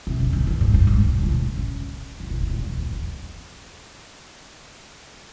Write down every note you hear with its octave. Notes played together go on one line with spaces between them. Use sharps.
C3
C#3
D#3
D3
G#2
G2
G#2
A#2
B2
A#2
C#3
C#3
C3
B2
A#2
F2
E2
F2